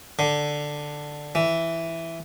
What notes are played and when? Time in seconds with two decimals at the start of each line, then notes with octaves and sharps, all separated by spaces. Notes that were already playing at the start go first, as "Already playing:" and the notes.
0.19 D3
1.35 E3